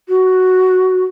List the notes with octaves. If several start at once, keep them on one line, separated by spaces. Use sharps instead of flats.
F#4